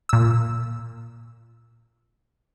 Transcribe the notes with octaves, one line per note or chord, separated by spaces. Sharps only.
A#2 E6